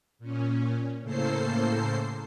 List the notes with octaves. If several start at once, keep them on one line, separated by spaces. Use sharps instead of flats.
A#2 C#4
A2 C#3 A#3 A4 C5 C7